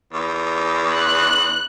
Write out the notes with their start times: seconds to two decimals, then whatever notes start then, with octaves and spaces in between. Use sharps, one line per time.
0.12 E2
0.94 F#6